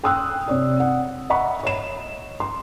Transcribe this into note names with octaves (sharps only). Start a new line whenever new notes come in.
G5 C6 D#6 E6 F#6
C3 C#5 D5
F#5
D#5 E5 F#5 A#5 B5 C#6
C#5 D#5 E7
C6